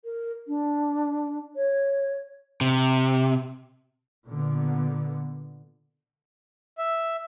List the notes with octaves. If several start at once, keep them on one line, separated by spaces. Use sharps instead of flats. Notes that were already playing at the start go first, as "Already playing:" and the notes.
A#4
D4
C#5
C3
A#2 D3 B3
E5